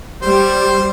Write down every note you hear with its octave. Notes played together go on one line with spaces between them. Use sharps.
G3 C5